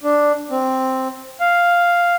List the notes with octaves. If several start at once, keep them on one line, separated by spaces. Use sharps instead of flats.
D4
C4
F5